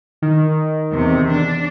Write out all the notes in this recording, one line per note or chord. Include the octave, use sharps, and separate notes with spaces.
D#3
E2 C3
D4